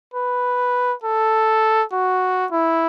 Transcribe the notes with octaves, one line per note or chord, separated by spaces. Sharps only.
B4
A4
F#4
E4